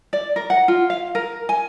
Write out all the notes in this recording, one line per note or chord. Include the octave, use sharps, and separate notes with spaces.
D5
A#4
F#5
F4
F5
A#4
G#5